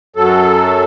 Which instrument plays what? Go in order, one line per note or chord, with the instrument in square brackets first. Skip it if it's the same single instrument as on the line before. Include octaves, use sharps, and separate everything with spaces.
[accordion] F#2 F#3 A4